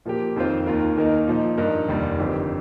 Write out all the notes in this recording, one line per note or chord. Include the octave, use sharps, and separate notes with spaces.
A#2 F3 A#3 G4
F2 D#3 C4 F4 C5
D#2 D#3 A#3 F4 A#4
D#2 D#3 A#3 D#4 A#4
A#2 F3 D#4
G2 F3 D#4 A#4
F1 D#2 D#3 G3
G1 F2 D#3 C4 G4